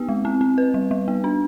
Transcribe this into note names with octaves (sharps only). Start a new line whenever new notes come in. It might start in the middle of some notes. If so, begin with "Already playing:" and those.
Already playing: B3 G4
G#3
C4
C4
B4
G3
G3
B3
D4